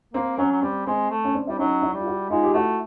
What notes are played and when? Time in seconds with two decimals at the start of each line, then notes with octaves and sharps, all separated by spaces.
0.14 A#3 C4
0.38 F#3 C#4
0.51 F#3
0.62 G3 C4
0.87 G#3 C4
1.10 A3
1.24 C#4
1.34 C4 D4
1.47 G3 E4
1.58 F#3 C#4 D#4
1.82 D4 E4
1.94 G3 F4
2.06 E4 F#4
2.30 G#3 D#4 F4
2.43 G4
2.54 A3 E4 F#4